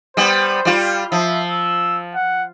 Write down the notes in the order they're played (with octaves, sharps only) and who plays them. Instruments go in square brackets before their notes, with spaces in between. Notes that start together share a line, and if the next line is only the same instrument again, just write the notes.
[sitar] G3 B3 [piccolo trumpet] C5
[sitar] G3 F4
[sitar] F3 [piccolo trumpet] E5
[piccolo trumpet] E6
F#5